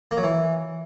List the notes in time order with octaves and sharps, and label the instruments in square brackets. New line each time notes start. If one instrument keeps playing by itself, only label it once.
[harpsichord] A#3
F#3
E3